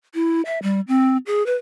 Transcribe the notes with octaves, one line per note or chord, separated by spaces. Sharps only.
E4
E5
G3
C4
G#4
B4